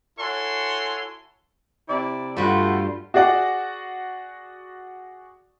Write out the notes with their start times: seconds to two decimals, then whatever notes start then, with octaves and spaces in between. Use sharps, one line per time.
0.18 E4 F#4 A4 C#5 G#5 C6
1.89 C3 E4 D5
2.37 G2 G3 A3 F4 F#4
3.14 F#4 G#4 D5 F#5